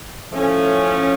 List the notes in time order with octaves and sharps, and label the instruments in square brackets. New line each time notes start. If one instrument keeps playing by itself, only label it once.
[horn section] A2 F3 A3 C#4